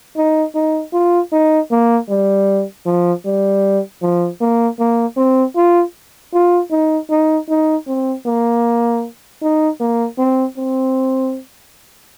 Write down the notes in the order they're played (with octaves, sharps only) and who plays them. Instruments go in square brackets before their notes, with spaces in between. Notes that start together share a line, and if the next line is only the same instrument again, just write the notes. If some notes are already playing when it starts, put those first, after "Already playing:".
[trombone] D#4
D#4
F4
D#4
A#3
G3
F3
G3
F3
A#3
A#3
C4
F4
F4
D#4
D#4
D#4
C4
A#3
D#4
A#3
C4
C4